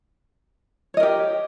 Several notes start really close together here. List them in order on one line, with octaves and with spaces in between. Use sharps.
C#5 D#5 A#4 G4